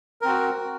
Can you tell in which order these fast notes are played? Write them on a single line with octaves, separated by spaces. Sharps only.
A#4 C4 F#4